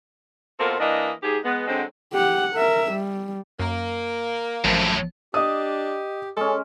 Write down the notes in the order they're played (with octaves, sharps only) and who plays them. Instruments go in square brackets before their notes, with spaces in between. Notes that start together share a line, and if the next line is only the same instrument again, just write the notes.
[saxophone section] B2 A#3 C4 F4 A4 A#4
E3 A#3 D4 D#5
G#2 G4 G#4
G#3 B3
D3 F#3 G#3 C4
[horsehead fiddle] G4 F#5
A#4 E5
G3
[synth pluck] F#2 [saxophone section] A#3
[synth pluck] A1 F3 [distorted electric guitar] F#2 A2
[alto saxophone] D4 [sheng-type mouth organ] G4 [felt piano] D#5 D#6
[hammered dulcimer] G#3 C#4 [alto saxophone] A4